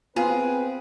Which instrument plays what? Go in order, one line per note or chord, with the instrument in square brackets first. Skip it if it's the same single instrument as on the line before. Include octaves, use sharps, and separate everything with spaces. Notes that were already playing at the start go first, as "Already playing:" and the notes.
[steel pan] B3 F4 [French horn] C4 [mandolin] G#4 [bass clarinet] B4